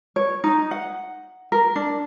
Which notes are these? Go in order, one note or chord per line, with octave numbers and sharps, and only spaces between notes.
C#5
D#4
F#5
A#4
D4